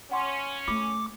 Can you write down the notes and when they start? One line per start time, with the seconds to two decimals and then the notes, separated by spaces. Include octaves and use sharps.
0.11 C#4 F#5 C6 D6
0.68 A3 F4 B5 D6